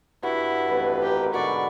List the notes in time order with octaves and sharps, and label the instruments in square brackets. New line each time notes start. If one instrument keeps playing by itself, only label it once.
[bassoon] G2 [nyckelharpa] E4 [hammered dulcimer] F#4
[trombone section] A1 F2 B4
[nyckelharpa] G4 [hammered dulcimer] A#4
[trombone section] G#2 B2 D3 [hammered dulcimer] F#4 B4 [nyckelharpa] D5 C#6